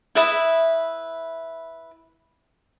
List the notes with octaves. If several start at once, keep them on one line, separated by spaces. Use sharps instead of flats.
E4 B4 E5 D#6